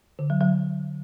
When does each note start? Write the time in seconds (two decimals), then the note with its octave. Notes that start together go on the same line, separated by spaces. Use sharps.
0.19 D3
0.30 F#3
0.41 F#3